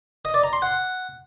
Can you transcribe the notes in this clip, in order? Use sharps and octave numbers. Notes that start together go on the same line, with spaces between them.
D#5
D5
A#5
C6
F#5